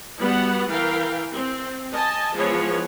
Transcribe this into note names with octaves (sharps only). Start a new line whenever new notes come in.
G3 B3 F#4 F#5
E3 A#4 F5 G5
C4
D#5 G#5 A5
E3 F3 G#3 B3 G#4 C#5